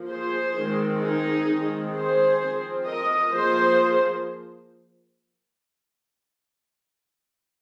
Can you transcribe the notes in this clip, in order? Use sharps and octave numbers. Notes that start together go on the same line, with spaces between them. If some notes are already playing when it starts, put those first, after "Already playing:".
Already playing: F3 A#3
G#4 C5
D#3 G#3 C4
D#4 G#4
D#3 G#3 C4
G#4 C5
F3 C4
A#4 D#5
F3 A#3 G#4 C5